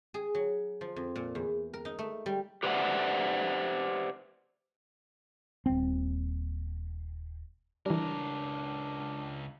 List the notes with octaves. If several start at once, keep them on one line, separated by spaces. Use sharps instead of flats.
G#4
F#3
F3
F2
A#2
E2
A#4
D#4
A3
G3
G4 B4 C5 D5 E5 F#5
D#1 C4
C#2 E3 G3 D4 A#4